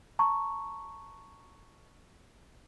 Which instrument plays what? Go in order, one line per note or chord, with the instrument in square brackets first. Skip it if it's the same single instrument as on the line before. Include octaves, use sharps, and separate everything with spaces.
[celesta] A5 A#5 C#6